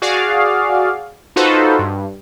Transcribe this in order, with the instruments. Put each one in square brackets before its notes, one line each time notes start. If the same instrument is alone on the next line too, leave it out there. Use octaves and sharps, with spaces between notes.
[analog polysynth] F#4 G#4 D5 F5
D#4 F4 F#4 A4 B4 C5
G2